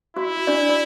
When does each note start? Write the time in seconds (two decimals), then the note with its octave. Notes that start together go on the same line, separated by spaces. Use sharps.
0.17 E4 F#4
0.47 D4 D5
0.69 D5